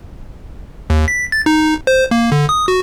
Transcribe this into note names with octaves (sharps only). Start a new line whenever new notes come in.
D#2
B6
A6
D#4
C5
A#3
D3
D#6
F#4